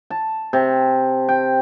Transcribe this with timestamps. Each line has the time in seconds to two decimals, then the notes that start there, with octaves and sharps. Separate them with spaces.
0.10 A5
0.53 C3
1.28 G5